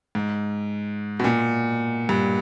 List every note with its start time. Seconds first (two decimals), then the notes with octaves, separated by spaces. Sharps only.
0.15 G#2
1.20 B2
1.24 A#2
2.09 G2